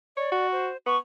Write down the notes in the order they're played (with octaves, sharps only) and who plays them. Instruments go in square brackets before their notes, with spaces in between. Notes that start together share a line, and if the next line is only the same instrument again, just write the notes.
[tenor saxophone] C#5 [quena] D5
[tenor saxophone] F#4
[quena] C5
[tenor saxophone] B3 [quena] C#6